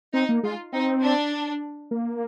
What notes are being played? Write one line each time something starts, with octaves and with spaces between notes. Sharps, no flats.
C4 D#4
A#3
G#3 F4
C4 D#4
D4
A#3